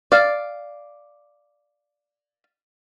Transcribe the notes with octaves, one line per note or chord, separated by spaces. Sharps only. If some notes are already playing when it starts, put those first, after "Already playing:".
D5 F5